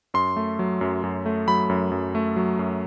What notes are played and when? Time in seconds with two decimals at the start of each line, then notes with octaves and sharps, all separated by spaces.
0.14 F#2 C6
0.36 A3
0.59 F#3
0.81 F#2
1.04 F#2
1.26 A3
1.48 F#3 B5
1.70 F#2
1.91 F#2
2.15 A3
2.36 F#3
2.59 F#2